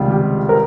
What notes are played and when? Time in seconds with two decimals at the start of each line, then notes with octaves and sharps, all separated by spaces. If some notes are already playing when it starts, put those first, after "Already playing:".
Already playing: C#2 C3 D#3 G3 F4
0.11 G4
0.49 A#4